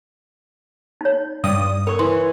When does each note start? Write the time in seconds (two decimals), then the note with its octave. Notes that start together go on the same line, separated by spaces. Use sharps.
1.01 D#4 C#5
1.44 G2 D#6
1.87 A#4 C#5 C#6
1.99 E3 C6